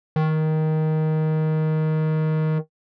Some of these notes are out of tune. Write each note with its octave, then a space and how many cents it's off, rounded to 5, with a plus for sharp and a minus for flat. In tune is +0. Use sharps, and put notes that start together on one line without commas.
D#3 +10